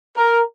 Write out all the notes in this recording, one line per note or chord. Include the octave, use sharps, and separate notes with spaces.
A#4